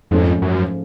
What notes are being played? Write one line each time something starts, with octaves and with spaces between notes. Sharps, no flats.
F2 G#2 F3 A3 C#4
F#2